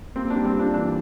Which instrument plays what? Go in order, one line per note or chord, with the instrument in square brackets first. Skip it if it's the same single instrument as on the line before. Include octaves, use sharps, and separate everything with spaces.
[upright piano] A#3 [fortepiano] C4
[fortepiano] D4
[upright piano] G3
[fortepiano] C4
[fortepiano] D4 [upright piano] F4
[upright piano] E3 [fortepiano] D4